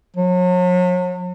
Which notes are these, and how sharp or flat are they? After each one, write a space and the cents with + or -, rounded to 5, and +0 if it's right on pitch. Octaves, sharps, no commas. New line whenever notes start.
F#3 -40